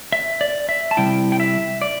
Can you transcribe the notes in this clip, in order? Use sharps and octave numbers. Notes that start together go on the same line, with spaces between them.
E5
D5
E5
A5
C3 G3 E4 G5
G5
E5
D5